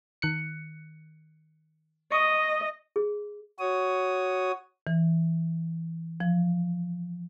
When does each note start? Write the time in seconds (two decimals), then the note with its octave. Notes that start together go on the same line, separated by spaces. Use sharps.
0.22 D#3 F#6 C#7
2.12 D#5 C#6 D#6
2.96 G#4
3.59 F#4 C#5 D#6
4.87 E3
6.20 F3